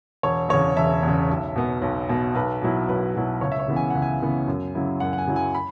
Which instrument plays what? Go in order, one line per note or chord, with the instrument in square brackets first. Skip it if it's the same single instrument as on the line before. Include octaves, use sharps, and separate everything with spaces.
[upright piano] E1 C#5
E2 C#3 C#5
E1 E5
E2 C#3
B1
B2 B3
B1
B2 B3
B1 B4
B2 F#3 E4
B1 B4
B2 F#3 E4
C#2 C#5
E5
C#5
C#3 E3 B3
G#5
C#2 F#5
G#5
C#3 E3 B3
F#2
C#3 F#3 E4
F#2 F#5
F#5
G#5
C#3 F#3 E4
G#5
B5